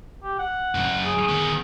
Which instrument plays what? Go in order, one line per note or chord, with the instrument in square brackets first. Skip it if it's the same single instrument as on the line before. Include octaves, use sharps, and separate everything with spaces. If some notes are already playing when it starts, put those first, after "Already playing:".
[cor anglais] G4
F#5
[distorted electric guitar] F#2 C#3
[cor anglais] G#4
[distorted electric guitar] D#3 B3